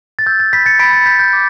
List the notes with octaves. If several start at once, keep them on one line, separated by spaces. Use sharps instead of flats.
A6
E6 G6
A6
B5 G6 B6
A6 C#7
B5 B6 D7
A6 C#7
G6 B6
G6
D6